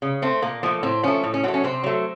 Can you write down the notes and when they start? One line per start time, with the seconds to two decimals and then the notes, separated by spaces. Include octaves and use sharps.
0.02 C#3
0.22 A3 C4
0.42 A#2 A#3
0.63 F3 A3 A#3
0.83 A2 C4
1.03 F3 A3 C#4
1.24 A2
1.34 C#4
1.43 F#3 C4
1.48 A3
1.54 C#4
1.64 C3 C4
1.84 F#3 A3